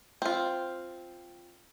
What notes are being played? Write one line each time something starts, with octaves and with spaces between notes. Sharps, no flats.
C4 F4